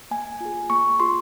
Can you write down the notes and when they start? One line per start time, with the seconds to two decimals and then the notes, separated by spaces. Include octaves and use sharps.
0.11 A#3 G#5
0.41 F4 G#4
0.70 A#3 C#6
1.00 F4 G#4 C6